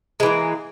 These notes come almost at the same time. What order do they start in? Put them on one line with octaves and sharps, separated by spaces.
G#3 E3 A#3